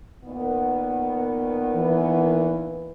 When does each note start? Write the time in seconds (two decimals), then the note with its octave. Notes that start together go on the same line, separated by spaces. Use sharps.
0.25 A#2 D#3 B3
1.76 E3